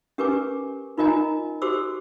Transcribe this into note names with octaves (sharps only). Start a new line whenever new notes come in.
C#4 G4 A#4 B4 G#5 D6
D#4 F4 A#4 D#5 G#5 A#5
F#4 G4 A4 C5 D6 E6